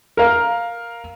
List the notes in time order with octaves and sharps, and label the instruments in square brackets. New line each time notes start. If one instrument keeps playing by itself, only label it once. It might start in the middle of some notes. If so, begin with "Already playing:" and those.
[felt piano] A#4 F5